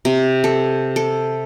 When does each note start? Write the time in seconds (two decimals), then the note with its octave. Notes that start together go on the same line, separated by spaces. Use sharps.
0.05 C3
0.44 A4
0.96 A4